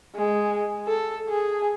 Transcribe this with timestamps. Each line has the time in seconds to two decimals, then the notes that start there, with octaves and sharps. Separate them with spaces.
0.15 G#3
0.87 A4
1.29 G#4